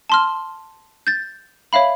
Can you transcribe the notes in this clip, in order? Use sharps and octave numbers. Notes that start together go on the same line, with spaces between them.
A5 C6 F6
G6 A6
C#5 E5 F5 B5